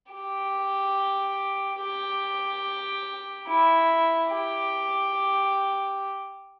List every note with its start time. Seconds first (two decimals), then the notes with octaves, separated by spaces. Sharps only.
0.12 G4
1.79 G4
3.48 E4
4.31 G4